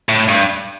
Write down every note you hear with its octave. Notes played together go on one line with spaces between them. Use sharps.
A2
G2